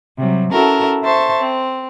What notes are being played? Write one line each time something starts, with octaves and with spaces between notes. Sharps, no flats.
C3 F#3 G3
C#4 E4 F#4 A4 A#4 A5
C5 E5 A5 C6 C#6
C4